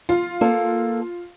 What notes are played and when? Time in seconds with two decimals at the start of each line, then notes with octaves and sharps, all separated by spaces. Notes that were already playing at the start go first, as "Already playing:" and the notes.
0.09 F4
0.41 A#3 A4